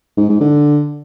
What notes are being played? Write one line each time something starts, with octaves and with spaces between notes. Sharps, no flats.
G#2
G#2
D3